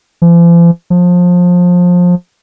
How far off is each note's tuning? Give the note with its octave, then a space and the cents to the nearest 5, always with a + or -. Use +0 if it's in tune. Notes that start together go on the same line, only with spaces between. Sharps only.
F3 -45
F3 +25